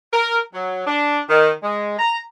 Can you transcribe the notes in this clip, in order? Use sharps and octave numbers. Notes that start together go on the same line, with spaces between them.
A#4
F#3
D4
D#3
G#3
A#5